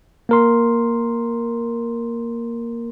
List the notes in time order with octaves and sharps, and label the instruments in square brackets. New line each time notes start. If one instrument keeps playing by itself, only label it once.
[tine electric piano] A#3 A#4 C6